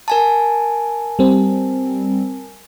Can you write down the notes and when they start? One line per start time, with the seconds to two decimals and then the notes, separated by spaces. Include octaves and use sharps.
0.08 A#4 G#5 A5
1.19 G3 C4